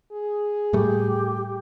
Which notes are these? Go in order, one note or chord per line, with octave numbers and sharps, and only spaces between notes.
G#4
A2 G3 A3 G4